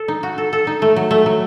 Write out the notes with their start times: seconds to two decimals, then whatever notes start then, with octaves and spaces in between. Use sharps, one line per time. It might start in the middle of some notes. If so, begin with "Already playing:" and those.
Already playing: A4
0.08 D#4
0.23 F#4
0.38 A4
0.53 A4
0.67 D#4
0.82 A3
0.96 F#3
1.11 A3
1.26 F#3